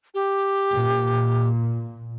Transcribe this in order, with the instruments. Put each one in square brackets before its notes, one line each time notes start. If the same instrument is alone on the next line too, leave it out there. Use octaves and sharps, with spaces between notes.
[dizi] G4
[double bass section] A#2